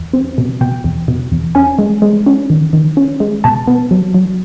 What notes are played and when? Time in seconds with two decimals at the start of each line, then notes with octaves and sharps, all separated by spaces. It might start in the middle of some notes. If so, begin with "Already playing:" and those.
Already playing: E2
0.13 C4
0.38 B2
0.61 B2 G5
0.84 E2
1.08 B2
1.32 E2
1.55 C#4 G#5
1.79 G#3
2.02 G#3
2.26 C#4
2.50 D#3
2.73 D#3
2.97 C#4
3.20 G#3
3.44 B2 A5
3.67 B3
3.91 F#3
4.14 F#3